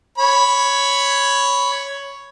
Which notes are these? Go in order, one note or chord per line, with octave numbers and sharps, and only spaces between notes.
C#5 B5